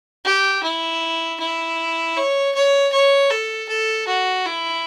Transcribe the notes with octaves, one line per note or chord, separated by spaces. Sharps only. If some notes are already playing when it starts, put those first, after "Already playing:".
G4
E4
E4
C#5
C#5
C#5
A4
A4
F#4
E4